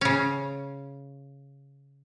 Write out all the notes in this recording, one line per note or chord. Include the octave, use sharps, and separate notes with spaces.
C#3 C#4